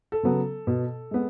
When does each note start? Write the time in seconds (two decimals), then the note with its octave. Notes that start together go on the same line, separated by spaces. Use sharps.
0.12 A4
0.23 C#3 F#3 B3
0.67 B2
1.11 G#3 B3